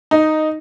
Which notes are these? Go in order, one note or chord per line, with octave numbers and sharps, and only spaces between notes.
D#4